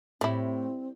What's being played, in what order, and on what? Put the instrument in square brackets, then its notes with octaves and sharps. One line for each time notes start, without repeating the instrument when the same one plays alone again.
[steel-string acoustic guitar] A2 [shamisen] G3 E4 [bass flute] C4